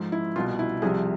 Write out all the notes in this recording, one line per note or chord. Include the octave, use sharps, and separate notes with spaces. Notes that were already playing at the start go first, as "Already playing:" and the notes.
Already playing: G#2 F3
E4
C2 B2 F4
E4
C2 C3 F3 G#4